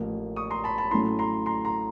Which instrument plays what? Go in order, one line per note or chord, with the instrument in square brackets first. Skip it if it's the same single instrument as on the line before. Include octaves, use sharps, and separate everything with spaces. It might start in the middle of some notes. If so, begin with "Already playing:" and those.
Already playing: [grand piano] A1 A2 F3 A#3
C#6 D#6
A#5 C6
A5 B5
A5 B5
A2 F#3 A3 C#4 E4 A#5 C6
A#5 C6
A#5 C6
A#5 C6